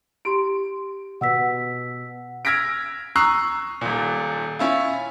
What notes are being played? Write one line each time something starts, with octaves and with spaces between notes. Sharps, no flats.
E4 G4 C6 D7
B2 B4 F#5 E6 B6
E6 F6 G#6 A#6 B6 D7
A#5 C#6 D#6 E6 F#6 C7
D#1 A#2
C#4 E4 F4